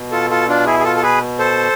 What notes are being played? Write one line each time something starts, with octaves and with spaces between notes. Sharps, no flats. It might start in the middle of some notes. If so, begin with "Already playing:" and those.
Already playing: B2
F4 A4
F4 A4
D4 F4
E4 G#4
G#4
F4 A4
A4
G#4 B4
A4 C5